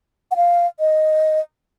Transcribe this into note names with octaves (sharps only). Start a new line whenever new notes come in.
F#5
F5
D#5